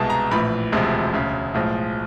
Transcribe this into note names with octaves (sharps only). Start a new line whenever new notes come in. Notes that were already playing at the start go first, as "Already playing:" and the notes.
Already playing: C2 B2 G#3 A5
A#5
A#1 A2 E3 B5
E1 D2 C3 F3 G#3
E1 D2 C#3
B1 A2 F3 G#3